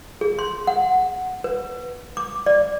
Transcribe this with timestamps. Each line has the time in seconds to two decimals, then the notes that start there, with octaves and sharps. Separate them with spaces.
0.21 G#4
0.39 C6
0.67 F#5
1.44 B4
2.17 D6
2.46 D5